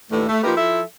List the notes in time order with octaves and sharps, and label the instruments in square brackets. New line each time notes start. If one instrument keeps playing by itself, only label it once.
[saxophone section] D#2 A2 D3 E3 A3
A3
F3 A#3 D#4 G4 A#4 B4
F3 E4 A4 E5